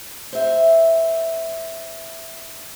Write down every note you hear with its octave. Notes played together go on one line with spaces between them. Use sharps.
C5 E5